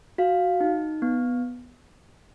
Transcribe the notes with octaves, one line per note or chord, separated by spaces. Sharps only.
F#4 F5
D#4
B3